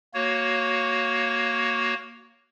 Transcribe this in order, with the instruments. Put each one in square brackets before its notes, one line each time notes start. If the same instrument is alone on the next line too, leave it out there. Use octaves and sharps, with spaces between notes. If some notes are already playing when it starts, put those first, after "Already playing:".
[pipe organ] A#3 F#4 C#5